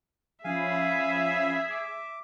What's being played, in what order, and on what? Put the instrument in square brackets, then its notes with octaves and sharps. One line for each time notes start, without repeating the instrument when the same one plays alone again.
[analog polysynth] F3 C#4 B5 [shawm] G#4 [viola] E5 [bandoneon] F5 G#5
[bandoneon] D6